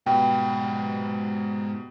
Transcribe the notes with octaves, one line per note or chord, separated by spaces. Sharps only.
G#2 B2 G3 B4 G5